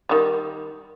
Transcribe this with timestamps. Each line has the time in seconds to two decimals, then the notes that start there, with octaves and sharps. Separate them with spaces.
0.09 D#3 G3